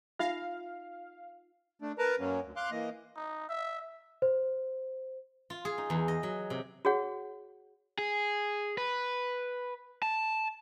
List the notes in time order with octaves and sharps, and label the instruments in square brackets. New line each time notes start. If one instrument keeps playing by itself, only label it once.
[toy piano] D#4 F4 E5 [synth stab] F5
[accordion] A3 D4
A#4 B4 A5 A#5
F#2 F#3 A#3 C#4
D2
F5 C6 D6 F#6
E3 A#3 D#5
[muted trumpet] D#4
E5
[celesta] C5
[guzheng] F4
G#4
D#4
E2
D#5
F#3
C3
[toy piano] F#4 G#4 C#5 F#5
[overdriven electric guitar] G#4
B4
A5